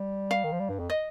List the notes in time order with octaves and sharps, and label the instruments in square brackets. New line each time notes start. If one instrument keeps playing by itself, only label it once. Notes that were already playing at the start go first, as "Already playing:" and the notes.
Already playing: [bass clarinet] G3
[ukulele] F5
[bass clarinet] D#3
F3
G3
G2
F2
[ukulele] D#5